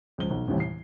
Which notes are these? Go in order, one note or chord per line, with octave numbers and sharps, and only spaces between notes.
C#2 F3 G7
B1
A1 D#2 C3 E3 G3
C7